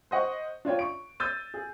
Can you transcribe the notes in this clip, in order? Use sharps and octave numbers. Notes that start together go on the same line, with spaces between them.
C5 D#5 F#5 C#6
D4 F4 C#5 G5
C#6 D7
E6 G6 A6 D#7
G#4